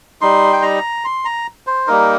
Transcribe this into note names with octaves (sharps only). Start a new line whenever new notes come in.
G3 D#4 C6
G5
A#5
C6
A#5
C5
G3 A#3 D#4 A#4